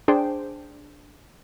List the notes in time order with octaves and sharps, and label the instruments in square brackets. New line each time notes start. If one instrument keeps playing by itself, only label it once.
[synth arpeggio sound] D4 G#4 C5 G5